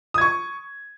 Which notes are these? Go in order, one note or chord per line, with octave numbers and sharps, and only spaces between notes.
C#6 D#6 G#6